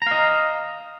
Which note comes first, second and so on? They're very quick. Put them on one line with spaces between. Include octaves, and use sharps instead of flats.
A#5 F5 D#5